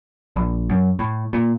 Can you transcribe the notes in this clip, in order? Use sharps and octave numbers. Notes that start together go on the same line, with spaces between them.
A#1
F#2
A2
A#2